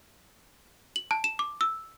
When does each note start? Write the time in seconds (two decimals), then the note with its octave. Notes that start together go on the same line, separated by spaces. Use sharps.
0.96 F#7
1.11 A5
1.24 E7
1.39 D6
1.61 E6